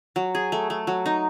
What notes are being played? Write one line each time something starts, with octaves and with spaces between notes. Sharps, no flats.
F#3
G#4
A3
A3
F#3
D#4